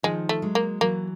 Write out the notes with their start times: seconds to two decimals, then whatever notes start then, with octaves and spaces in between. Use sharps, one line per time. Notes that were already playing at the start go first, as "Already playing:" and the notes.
0.03 D#3 F3 G#3
0.29 A3
0.42 F#3 G#3
0.55 A#3
0.81 E3 F#3 A#3